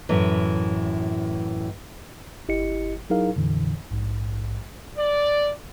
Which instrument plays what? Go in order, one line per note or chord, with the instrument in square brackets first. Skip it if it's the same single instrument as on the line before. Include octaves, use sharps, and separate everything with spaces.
[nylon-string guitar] F#2 A2 E3
[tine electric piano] G1 E4 G4 D#5 C#7
F#3 D#4 E4 G#4 A#4 F5
F2 A#2 D3 E3
A#1 G#2
[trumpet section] D5